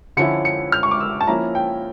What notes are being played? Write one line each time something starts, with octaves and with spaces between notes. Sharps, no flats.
D3 F3 C#4 E4 C#7
C#7
F6
C#6
D6
E6
A5
F3 A#3 C#4 E4 A#5
G5